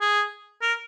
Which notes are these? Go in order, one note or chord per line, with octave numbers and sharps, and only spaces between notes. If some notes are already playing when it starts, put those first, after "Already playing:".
G#4
A#4